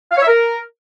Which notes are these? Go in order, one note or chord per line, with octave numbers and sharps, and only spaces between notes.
F5
C#5
E5
A#4